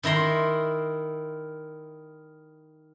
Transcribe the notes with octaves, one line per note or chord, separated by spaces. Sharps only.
D#3 E4 A#5 C6